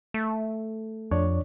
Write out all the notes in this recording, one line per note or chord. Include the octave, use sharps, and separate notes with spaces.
A3
F2 D4 C#5 D5